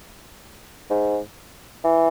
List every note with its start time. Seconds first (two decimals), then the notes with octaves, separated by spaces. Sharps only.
0.90 G#2
1.84 E3